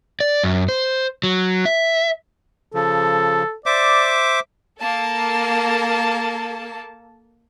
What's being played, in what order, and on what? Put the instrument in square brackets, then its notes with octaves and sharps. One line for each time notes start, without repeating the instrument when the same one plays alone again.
[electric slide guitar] D5
F#2
C5
F#3
E5
[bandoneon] C#3 F3 [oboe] A4
[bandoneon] C5 E5 D6 [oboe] D5
[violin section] A#3 A4 A5